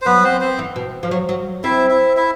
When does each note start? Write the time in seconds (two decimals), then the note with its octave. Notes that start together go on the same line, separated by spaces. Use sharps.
0.02 C5
0.05 F#3 B3 B4
0.24 C4 C5
0.41 C4 C5
0.59 E3
0.76 B2
1.03 F3
1.11 F#3
1.29 F#3
1.64 C4 E4 E5
1.90 E4 E5
2.17 E4 E5